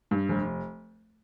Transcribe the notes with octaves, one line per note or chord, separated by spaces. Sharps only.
G2
F1